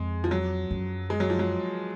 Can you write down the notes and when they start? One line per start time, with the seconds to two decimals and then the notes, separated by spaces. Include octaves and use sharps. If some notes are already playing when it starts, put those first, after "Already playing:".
Already playing: F2 G#3
0.24 F3
0.31 F#3
0.71 F#2
1.10 G#3
1.20 F#3
1.30 F3
1.39 F#3